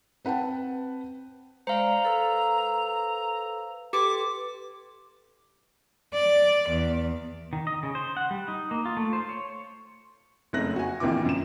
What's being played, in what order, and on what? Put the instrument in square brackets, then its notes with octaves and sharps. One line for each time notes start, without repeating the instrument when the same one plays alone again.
[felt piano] C4 B4 F#5 G5 A5
[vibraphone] G#3 D5 [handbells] C5 F5 [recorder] A#5
[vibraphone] A4 B4 E6
[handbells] G4 [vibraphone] A4 B4 C6 [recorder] D6
[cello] D5
E2
[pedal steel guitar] D#3
D#5
C#3
C5
F#5
G3
D#4
A#3
F4
A3
C5
C#5
[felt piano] F#1 F2 A3 D#4 F#6 A#6
F#4 G#5
A#1 F2 D#3 E3 F4 D6
F#2 E7